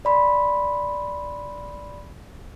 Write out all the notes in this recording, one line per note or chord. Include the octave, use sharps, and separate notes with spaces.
D5 B5 C6